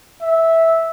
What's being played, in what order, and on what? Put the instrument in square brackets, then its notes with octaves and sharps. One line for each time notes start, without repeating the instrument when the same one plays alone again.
[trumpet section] E5